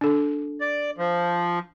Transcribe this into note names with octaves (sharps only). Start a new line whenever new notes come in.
D4 A4
D5
F3